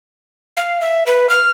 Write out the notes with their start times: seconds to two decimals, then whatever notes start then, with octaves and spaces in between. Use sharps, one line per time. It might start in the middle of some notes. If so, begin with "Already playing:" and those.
0.57 F5
0.81 E5
1.06 B4
1.29 F6